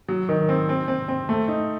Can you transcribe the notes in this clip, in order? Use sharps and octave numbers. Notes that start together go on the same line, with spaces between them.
F#3
D#3
C4
C4
C4
C4
A3
D#4